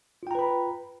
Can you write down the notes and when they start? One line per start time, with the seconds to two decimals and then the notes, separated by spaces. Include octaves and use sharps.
0.23 F4
0.27 G5
0.31 A#5
0.35 B4
0.39 B5